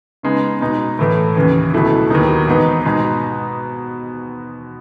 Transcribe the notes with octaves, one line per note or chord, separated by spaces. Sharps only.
C#3 G#3 B3 D#4
B2 G#3 D#4
A2 E3 A3
D#2 C#3 E3
C#2 B2 F#3 A3 E4
D#2 D#3 F#3 B3 D#4
G#2 E3 B3 D#4
B2 G#3 D#4